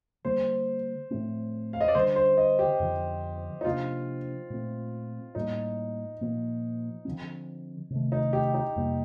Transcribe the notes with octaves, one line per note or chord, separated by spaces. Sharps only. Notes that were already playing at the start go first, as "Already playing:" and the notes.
D3 G3 A#3 C5
A2 F3 A3 C4
F5
D#5
D5
D3 G3 D4 C5
C5
D#5
G4
F2 D3 F3
D#4
C3 F3 A#3 D4 F4
A#2 A3 C4
A2 G3 A#3 D#4
A#2 F3 A#3
D3 F3 C4
C3 D#3 A3
D#4
G4
D#4
F2 C3 G3 A#3